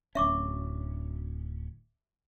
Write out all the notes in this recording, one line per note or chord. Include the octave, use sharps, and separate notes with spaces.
D1 C#4 E5 C#6 D6